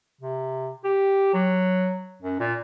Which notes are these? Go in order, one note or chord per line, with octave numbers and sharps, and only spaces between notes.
C3
G4
F#3
F#2
A#2